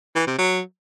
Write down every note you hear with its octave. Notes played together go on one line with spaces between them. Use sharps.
E3
C3
F#3